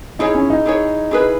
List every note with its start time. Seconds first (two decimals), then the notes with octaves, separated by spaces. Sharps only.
0.19 D#4 E4 G#4 C#5
0.35 C#4
0.50 D#4
0.66 E4 G#4 C#5
1.11 E4 G#4 B4